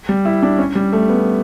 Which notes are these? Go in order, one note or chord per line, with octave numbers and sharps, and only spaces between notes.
G3
E4
D4
C#4
G3
A3
B3